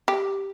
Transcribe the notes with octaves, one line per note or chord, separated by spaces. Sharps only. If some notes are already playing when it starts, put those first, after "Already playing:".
G4